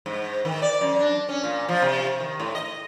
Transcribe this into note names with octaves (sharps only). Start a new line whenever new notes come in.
G#2
D#3
D5
F#2
D4
C#4
A#2
F3
C3
D#3
A2
D#5